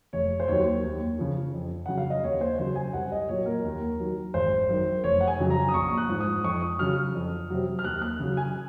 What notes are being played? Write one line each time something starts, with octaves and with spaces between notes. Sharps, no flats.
F1 C#5
C5
D#2 D#3 F#3 C#5
D#2
C#3 F3
F2
C#3 F#3 F#5
F5
D#5
D#2 C#5
C5
C#3 F#3 C5
G#5
C2 F#5
D#5
A#2 F#3 C#5
A#4
D#2
D#3 F#3
G#1 C5
F#2 D#3
F1 C#5
F#5
G#5
F2 C#3 F#3
A#5
D#6
A#1 C#6
F#6
G#2 F3
D#6
F2 C#6
D#6
C#3 F#3 F6
F2
C3 F#3
F6
D#2 F#6
F#6
C#3 F#3
G#5